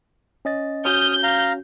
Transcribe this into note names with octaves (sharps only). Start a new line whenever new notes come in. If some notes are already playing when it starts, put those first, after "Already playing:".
C#4 D#5 A6
C#4 F#4 D#6 F6 G6
F5 A#5